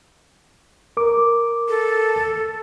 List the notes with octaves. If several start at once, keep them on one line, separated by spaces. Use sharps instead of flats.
A#4 D6
A4